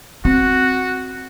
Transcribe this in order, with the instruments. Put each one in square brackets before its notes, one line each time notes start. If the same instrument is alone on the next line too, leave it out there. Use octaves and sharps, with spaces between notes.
[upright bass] C4 [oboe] F#4